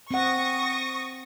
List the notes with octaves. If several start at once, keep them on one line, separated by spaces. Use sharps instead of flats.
C4 F#5 C#6 D#6 A#6